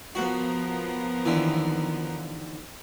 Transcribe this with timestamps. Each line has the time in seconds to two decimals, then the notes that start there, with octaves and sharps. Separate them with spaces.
0.15 F3 B3 F#4 A#4 F#5
1.25 D#2 D3 E3